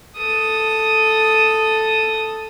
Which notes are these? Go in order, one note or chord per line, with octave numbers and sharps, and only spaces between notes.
A4 D#6